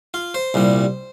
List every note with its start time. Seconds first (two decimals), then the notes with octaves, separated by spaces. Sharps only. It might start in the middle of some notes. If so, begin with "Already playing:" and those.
0.14 F4
0.34 C5
0.54 C2 A#2 G3